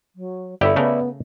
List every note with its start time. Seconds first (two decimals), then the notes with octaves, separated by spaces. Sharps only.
0.15 F#3
0.61 G1 E4 G4 A4 D5 E5 B5
0.76 C#3 A3 B3 A#4